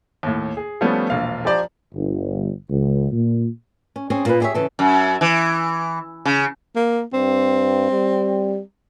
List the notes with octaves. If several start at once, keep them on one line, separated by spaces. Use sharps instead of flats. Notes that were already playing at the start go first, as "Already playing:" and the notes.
D#2 A2
G#4
F3 G3 A3 B3 C#4
E1 A#1 F5
F3 G4 C5 D5 A#5
G1
C#2
A#2
C#4
C4 C#4 G#4
A#2 A#3 G#4 A#4 B4
E4 G4 G#4 A#4 C#5 E5
C#3 E3 A4
F#2
E3
C#3
A#3
G2 C4
G3